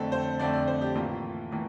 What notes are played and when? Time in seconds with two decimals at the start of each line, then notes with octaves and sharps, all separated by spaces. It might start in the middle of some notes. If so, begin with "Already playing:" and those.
Already playing: F2 D3 A3 C4 A4
0.12 C5
0.39 F2 D3 A3 C4 D5
0.53 D5
0.67 C5
0.81 G4
0.95 A2 E3 A#3 F4
1.51 A2 E3 A#3